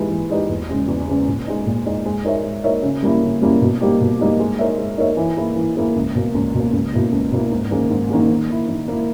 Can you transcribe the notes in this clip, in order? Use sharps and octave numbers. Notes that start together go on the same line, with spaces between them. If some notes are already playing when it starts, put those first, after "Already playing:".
Already playing: E3 G#3 D#4 G4 B4
E3
G#3 D#4 G4 B4
E2
C#3 G#3 C#4
E2
C#3 G#3 C#4
A#2
G#3 D#4
A#2
G#3 D#4
G#3
D#4 A#4 C#5 E5
G#3
D#4 A#4 C#5 E5
C#3
G3 A#3 C#4 E4
C#3
G3 A#3 C#4 E4
B2
G3 A#3 D#4 G4
B2
G3 A#3 D#4 G4
G#3
D#4 A#4 C#5 E5
G#3
D#4 A#4 C#5 E5
E3
A#3 E4 G#4
E3
A#3 E4 G#4
C#2
B2 A#3
C#2
B2 A#3
C#2
B2 A#3 E4
C#2
B2 A#3 E4
G#2
D#3 A#3 C#4 G#4
G#2
D#3 A#3 C#4 G#4
D#3
A#3 E4
D#3
A#3 E4